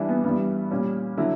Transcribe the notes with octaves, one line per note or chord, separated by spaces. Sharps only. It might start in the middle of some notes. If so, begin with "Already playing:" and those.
Already playing: E3 G3 D4 E4
B3
G2 E3 G3 B3
A#2 G3 C#4
D3 F#3 E4